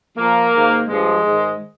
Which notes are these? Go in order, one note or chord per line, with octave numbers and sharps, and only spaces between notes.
A#2 F3 A#3
G#2 D#3
G2 F3 G#3
G#2 D#3